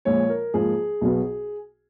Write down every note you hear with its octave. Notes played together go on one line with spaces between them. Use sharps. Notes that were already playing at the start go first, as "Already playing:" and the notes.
A#1 A#2 F3 G#3 C#5
A#4
G#2 F3 A#3 G#4
B1 B2 F#3 B3